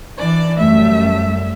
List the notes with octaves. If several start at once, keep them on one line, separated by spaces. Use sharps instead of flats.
E3 D4 D5
F#2 G3 A3 E5